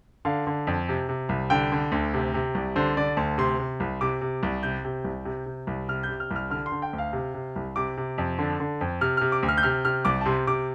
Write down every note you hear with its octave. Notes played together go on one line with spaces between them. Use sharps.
D3 F5
D3
F2
C3
C3
C2
D3 G5
D3
D2
C3
C3
C2
D3 C5
D3 D5
D2 A5
C3 C6
C3
C2
C3 D6
C3
C2
C3 G6
C3
C2
C3
C3
C2
C3 F6
G6
C3
F6
C2
F6
D3 F6
C6
D3
G5
D2
F5
C3
C3
C2
C3 D6
C3
F2
D3
D3
F2
C3 F6
C3 F6
D6
D2
F6
G6
C3 F6
C3 F6
C2 D6
A5
C3 C6
C3 D6